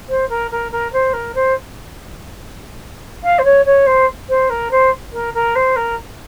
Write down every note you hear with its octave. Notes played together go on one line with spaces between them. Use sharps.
C5
A#4
A#4
A#4
C5
A#4
C5
F5
C5
C#5
C#5
C5
C5
A#4
C5
A#4
A#4
C5
A#4